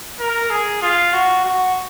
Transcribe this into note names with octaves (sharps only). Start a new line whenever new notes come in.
A#4
G#4
F4
F#4
F#4